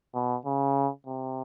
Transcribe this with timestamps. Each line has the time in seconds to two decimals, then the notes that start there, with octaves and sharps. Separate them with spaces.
0.14 B2
0.45 C#3
1.06 C3